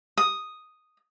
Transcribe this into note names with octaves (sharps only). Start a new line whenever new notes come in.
D#6